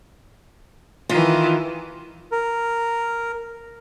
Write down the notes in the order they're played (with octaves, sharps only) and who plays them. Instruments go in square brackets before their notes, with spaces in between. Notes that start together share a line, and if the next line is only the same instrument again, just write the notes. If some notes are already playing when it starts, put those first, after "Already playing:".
[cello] D#3 E3 [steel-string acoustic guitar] F4
[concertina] A#4